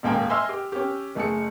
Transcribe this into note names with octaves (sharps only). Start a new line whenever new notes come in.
D#1 C#2 G#2 A#3 G5 G#5
D#5 E5 G#5 C6 E6 F6
G4
C#4 G4
F#1 A3 G#4 C#7